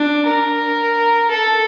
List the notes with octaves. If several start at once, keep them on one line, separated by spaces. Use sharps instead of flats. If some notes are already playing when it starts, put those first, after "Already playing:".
Already playing: D4
A#4
A4